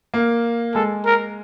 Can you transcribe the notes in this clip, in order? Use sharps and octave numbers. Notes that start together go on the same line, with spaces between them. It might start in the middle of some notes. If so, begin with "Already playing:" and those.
A#3
G#3 A4
A#4